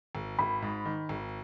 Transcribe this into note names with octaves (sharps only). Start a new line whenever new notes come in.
G#1
G#1 B5
G#2
D#3
G#1